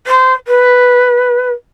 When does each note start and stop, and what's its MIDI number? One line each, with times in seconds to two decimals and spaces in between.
0.06 0.33 72
0.47 1.51 71